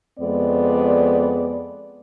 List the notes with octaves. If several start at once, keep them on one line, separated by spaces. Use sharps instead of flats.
F2 G#3 B3 D5